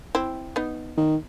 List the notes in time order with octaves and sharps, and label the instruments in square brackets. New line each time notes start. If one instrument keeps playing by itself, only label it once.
[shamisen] C4 E4
B3 D#4
[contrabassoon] D#3